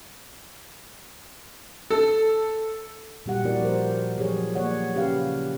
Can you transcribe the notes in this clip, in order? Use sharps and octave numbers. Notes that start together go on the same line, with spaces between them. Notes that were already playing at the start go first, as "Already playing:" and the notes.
A4
A#2 G3 F#4 G4 F#5
F3 B3 E4 F#4 A#4 D5
B3 A#4 C5
F3 F#3 G4 G#4 C#5
A#3 B3 C#5 D5 F#5
C#3 C#4 G4 B4 F5